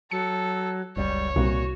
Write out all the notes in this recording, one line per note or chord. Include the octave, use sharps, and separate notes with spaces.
F#3 A4 C#7
F#1 C#2 G3 C#5
C2 A#2 F#4